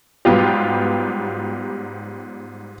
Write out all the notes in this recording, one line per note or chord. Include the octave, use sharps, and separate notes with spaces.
G#2 F#3 G3 B3 F4 G4